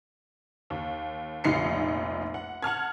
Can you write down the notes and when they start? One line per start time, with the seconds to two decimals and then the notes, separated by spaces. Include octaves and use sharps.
0.70 D#2
1.44 F1 A#1 D#4 C7 C#7
2.34 F#5
2.62 F#5 A5 F6 G#6